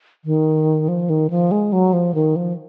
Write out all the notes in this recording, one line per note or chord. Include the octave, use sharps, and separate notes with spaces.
D#3
F3
D#3
F3
G#3
F#3
F3
D#3
F3